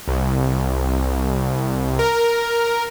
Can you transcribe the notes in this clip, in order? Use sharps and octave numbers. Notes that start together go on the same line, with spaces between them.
C2
A#4